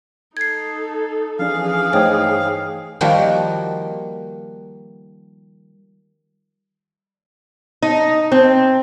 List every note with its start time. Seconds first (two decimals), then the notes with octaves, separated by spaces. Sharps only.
0.37 D#4 A4 G#6 C7
1.39 E3 F3 C#4 D4 G#4 F5
1.93 G2 A3 D#4 C5 C#5 G5
3.01 D#3 F3 G3 A#3 F#4
7.83 D#4
8.32 C4